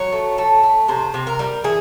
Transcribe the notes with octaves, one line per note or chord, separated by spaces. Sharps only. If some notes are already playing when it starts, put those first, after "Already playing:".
Already playing: F#3 C#5
A3
A3
A3
C3 C5
C3
A#4
G3
E3 G#4